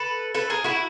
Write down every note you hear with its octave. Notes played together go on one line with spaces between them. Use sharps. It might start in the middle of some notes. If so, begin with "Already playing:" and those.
Already playing: A4 B4
A4 B4
G#4 A#4
E4 F#4